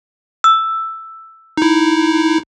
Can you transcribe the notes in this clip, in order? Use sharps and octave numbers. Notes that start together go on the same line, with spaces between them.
E6
D#4 E4